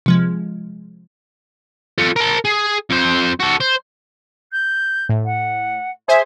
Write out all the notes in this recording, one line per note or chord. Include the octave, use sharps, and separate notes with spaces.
C3 F3 G#3
F4 A4
A#4 A5
G#4
F2 C5
F#4 A4
C5
G6
A2
F#5
G#4 C5 E5 G#5